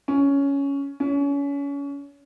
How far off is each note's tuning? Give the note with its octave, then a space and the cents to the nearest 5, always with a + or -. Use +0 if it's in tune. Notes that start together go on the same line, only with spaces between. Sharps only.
C#4 +10
C#4 +30